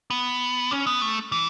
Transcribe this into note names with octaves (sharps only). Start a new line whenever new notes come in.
B3
C#4
B3
A3
E3